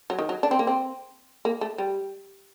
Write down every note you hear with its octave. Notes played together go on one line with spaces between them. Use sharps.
F#3
D#3
F#3
D4
C4
A#3
C4
A#3
A3
G3